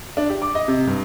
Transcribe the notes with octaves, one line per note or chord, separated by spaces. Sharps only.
D4
G4
D6
D#5
C3
G2